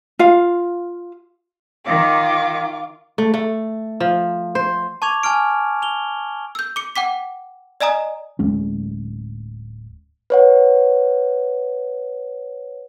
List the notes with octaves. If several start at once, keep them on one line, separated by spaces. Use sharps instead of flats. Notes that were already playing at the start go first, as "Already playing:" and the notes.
F4 F5
D#3 F4 D6
A3
A3
F3
C5
A5 C#6 D6 G#6 F7
G#5 A5 C#6 F6 D7
F7 G7
E6 G6
D6 C#7
F#5 G5 D6 B6
D5 D#5 G#5 A#5 D#6
D1 G#3 C#4
B4 C#5 F#5